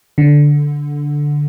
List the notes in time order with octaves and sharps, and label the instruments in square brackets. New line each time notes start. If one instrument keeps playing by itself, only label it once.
[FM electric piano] D3